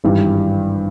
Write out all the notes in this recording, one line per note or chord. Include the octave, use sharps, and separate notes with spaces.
G#1 G2 E3 G3